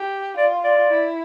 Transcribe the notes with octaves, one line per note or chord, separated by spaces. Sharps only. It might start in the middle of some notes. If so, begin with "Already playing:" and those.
Already playing: G4
F4 D5
D5
E4